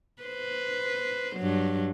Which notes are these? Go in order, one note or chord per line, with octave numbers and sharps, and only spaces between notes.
B4 C5
G2 F#3